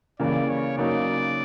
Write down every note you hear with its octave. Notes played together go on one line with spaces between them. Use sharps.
C#3 E3 G3 A#3 D5
C#5
C#3 F#3 A#3 D#4 D5